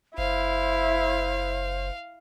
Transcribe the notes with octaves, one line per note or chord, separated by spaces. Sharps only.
F#1 E4 C5 F5